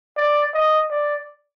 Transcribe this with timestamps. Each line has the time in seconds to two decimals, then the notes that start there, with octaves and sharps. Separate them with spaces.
0.17 D5
0.54 D#5
0.90 D5